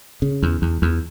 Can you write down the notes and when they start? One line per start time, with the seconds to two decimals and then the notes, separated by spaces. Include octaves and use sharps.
0.22 C#3
0.43 E2
0.62 E2
0.82 E2